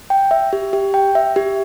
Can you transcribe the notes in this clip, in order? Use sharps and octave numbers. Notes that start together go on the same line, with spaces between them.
G5
E5
G4
G4
G5
E5
G4